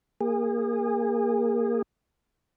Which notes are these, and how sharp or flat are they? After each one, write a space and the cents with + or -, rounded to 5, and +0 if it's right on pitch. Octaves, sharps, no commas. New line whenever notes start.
A#3 +0 G#4 -30